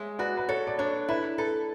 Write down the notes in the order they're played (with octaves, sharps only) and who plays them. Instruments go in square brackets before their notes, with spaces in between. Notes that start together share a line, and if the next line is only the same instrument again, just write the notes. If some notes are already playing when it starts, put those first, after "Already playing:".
Already playing: [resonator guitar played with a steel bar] G#3 [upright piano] C#5 E5
[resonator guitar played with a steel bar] F#4 [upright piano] B4 D5
[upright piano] B4
[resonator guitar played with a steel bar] A4 [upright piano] C#5
[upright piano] D5
[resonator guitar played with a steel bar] D4 [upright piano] C#5
[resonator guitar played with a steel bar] E4 [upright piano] B4
[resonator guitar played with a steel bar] A4 [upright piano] B4